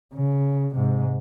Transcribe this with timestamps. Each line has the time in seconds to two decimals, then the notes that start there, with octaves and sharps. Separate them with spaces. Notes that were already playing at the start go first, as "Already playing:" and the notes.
0.15 C#3
0.75 G#2 C3